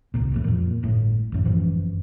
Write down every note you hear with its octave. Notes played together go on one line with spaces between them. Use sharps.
D1 C2 A#2
D#1 E2 A2
F2 A#2
G1 A2
A1 F#2 A2
G#1 F#2 E3 F3